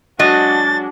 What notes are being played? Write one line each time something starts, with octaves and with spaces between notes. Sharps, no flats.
F#3 G#3 D4 F#4 D#5 A6